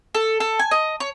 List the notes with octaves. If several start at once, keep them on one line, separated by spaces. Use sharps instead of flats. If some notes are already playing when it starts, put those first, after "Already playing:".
A4
A4
G#5
D#5
C#5